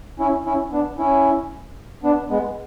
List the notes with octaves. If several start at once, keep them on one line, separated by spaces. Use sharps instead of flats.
C#4 E4
C#4 E4
B3 D4
C#4 E4
B3 D4
G#3 B3